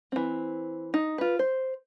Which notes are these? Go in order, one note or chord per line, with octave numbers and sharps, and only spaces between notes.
E3 C4
D#4
F4 B4
C5